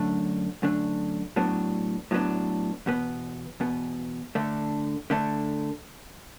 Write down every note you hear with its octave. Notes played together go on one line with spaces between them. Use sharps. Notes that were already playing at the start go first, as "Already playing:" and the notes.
Already playing: F#2 D3 A3 D4
F#2 D3 A3 D4
A2 F#3 B3 D4
A2 F#3 B3 D4
E2 B2 B3
E2 B2 B3
D3 A3 D4
D3 A3 D4